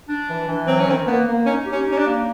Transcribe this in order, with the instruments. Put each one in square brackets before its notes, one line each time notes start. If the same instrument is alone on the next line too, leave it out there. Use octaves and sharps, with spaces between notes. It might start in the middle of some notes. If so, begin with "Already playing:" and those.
[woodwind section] D4
E3
E3
[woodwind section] F#3 [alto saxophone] C4
[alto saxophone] C#4
[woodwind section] D#3 [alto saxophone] C4
[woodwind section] A#3 [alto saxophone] B3
[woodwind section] A#3
[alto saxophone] C#4 [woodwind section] D#4
[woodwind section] G4
[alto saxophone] C#4
[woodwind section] D#4
[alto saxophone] C#4
D4
[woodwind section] A#3